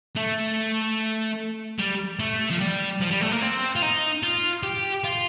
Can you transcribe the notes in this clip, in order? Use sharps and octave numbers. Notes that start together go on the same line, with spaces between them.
A3
G3
A3
F3
G3
F3
G3
A3
A#3
C4
F4
D#4
F4
G4
F4